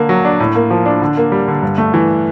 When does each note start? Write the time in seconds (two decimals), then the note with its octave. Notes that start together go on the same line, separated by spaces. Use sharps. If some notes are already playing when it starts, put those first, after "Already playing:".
Already playing: D3 A#3
0.09 F#3
0.25 D4
0.40 A2
0.55 A#3
0.71 F3
0.86 D4
1.02 D3
1.17 A#3
1.32 G3
1.48 D3
1.62 G2
1.78 A3
1.94 E3